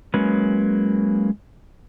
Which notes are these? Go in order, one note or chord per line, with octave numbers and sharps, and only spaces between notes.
F#3 G#3 A#3 C#4 B4